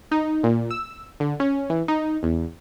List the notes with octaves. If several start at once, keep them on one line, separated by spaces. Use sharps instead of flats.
D#4
A#2
E6
D3
C#4
E3
D#4
E2